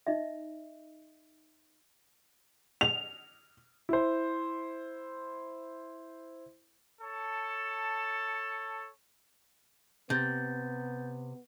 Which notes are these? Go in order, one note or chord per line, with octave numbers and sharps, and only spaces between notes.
D#4 D#5 E5
F7
E4 C5
A4 C#5 A5
C3 B3 G6 A6